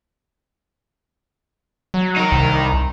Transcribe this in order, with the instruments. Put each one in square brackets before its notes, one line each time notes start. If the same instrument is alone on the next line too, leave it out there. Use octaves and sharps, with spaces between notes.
[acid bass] F#3
[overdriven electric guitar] D#4 A#4
[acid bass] C2